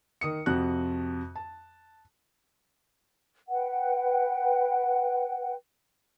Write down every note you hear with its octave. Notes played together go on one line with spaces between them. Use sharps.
D#3 D#6 C#7
F2 C3 F#4 F#6
A5
B4 F#5 G5